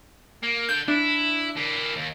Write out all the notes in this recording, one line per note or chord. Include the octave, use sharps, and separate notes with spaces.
A#3
D3 G6
D4 E4
A#3 E4
D#2